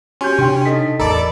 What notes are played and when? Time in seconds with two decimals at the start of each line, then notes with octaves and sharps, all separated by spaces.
0.21 C#4 F#4 G4 G#5 C6 G6
0.39 C3 D4 G5 C6
0.65 D#4 A4 D#5 B6
0.99 A1 E2 A4 A#4 D5 D#5 A#5 B5